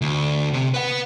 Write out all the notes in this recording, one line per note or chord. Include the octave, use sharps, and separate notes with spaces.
D2
C3
B4 F#5